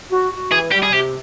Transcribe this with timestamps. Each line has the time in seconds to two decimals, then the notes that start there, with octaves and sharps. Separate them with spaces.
0.11 F#4
0.32 F#4
0.51 E3 G#4
0.71 G3 G4
0.83 G#4
0.92 C3 G4